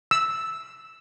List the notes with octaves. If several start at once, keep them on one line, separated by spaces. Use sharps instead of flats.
E6